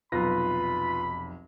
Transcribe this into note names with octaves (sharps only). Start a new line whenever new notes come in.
F1 B1 F4 B4 B5 A#6